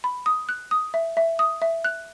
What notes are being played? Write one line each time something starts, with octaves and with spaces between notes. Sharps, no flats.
B5
D#6
F#6
D#6
E5
E5
D#6
E5
F#6